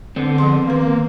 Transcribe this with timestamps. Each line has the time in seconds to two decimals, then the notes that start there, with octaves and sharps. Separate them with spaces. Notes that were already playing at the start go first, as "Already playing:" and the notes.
0.16 D3 B3 C4
0.38 F3 G#4 C6
0.67 D#3 A#3 B4